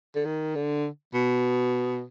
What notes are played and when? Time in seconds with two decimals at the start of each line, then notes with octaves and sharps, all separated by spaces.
0.15 D3
0.25 D#3
0.55 D3
1.14 B2